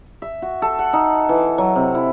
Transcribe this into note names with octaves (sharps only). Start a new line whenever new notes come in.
E5
F#4
A4
F#5
D#4
E3
F#3
C3
E4